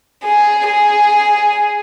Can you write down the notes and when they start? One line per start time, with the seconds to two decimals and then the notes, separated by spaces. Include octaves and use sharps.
0.24 G#4
0.68 G#4